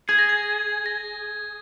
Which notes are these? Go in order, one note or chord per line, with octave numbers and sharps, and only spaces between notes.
G#4 G#6
A#6
G#6
A#6